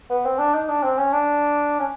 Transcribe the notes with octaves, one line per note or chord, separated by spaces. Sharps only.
B3
C4
D4
D#4
D4
C4
C#4
D4
C#4